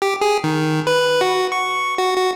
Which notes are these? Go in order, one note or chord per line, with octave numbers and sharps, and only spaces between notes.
G4
G#4
D#3
B4
F#4
C#6
F#4
F#4